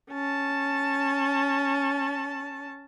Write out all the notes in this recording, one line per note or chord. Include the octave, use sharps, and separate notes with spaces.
C#4 A5